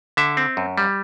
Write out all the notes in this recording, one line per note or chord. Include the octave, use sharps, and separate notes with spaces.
D3 E5
C4
F#2
G3